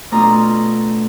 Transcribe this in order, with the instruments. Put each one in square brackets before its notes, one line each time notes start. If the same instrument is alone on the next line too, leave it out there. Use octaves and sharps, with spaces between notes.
[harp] B2 A3 D4 F4 A#5 D#6